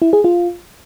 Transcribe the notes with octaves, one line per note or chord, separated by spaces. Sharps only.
E4
G#4
F4